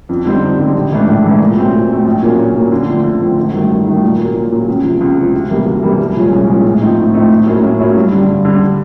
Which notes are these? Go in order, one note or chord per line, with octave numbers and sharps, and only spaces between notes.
F2
D3 G3 C4 D#4
F2
D3 G3 C4 D#4
A#1
G#2 E3 A3 D4
A#1
G#2 E3 A3 D4
A#2
F#3 A3 C4
A#2
F#3 A3 C4
A#1
A#2 F#3 A#3 C#4
A#1
A#2 F#3 A#3 C#4
D3
F3 A3 C4
D3
F3 A3 C4
G#1
G2 D#3 F#3 A3
G#1
G2 D#3 F#3 A3
A#2
F#3 A#3
A#2
F#3 A#3
C#2
C3 F3
C#2
C3 F3
D2
C3 E3 G3 A#3
D2
C3 E3 G3 A#3
C2
A#2 F3 G#3 C#4
C2
A#2 F3 G#3 C#4
A2
F3 A3 C4 D#4
A2
F3 A3 C4 D#4
A2
F#3 A#3 C#4 E4
A2
F#3 A#3 C#4 E4
G2
D3 G3
G2
D3 G3